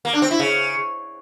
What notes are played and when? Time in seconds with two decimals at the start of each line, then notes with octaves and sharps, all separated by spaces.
0.05 A#3
0.13 D4
0.22 C4
0.31 E4
0.39 C#3